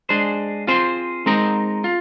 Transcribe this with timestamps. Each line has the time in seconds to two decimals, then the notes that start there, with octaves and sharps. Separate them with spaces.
0.09 G#3 D4 G#4 C5
0.67 C4 F4 G#4 C5
1.26 G#3 C4 D#4 A#4 D#5
1.84 F4